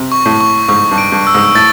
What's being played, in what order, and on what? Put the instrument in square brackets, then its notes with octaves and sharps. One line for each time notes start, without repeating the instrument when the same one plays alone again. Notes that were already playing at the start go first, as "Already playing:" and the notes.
Already playing: [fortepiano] C3
[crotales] C#6
[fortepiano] A2
[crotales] C#6
[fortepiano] G#2 [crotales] C#6
[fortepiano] G2
[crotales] D7
[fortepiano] G2
[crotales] E6
[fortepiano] G#2
[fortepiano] A2 [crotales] A6